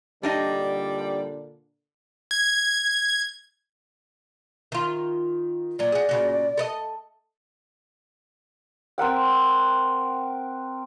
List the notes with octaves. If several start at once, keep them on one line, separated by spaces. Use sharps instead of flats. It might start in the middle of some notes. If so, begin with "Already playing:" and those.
A#2 D3 G3 D4 D#4 D#5
G#6
D#3 F4
A#2 F#3 D5
F#4 G#4
A#2 C#3 F#4
A4 A#4 D#5
C4 A#4 F#5 G5